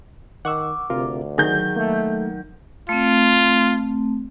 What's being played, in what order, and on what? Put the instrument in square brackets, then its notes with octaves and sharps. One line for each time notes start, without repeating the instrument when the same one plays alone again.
[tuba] D#3 [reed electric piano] F#5 C#6 E6 [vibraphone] D6
[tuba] D2 [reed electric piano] C3 F4 A#4
[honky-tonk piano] D#3 G6 [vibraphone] F#3 [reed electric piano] G#4
[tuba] A3 [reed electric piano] A#3
[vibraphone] A3 C4 [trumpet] F4